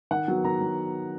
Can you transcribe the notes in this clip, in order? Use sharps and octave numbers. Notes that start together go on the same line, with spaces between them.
D#3 F#5
F#3 B3
D#3 A#5
F#3